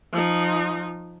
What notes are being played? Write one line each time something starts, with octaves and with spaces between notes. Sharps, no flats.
F3 D#4